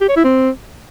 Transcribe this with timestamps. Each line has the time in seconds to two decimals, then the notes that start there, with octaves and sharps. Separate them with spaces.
0.01 G4
0.09 C#5
0.17 E4
0.24 C4